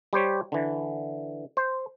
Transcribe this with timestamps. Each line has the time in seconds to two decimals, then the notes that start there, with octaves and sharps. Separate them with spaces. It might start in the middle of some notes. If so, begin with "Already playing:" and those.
0.13 G3 G4 C5 C#5
0.52 D3 E3
1.57 C5